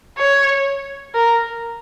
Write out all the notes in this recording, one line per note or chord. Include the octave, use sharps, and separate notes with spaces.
C#5
A#4